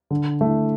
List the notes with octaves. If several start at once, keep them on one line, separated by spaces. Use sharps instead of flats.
D3
A3 E4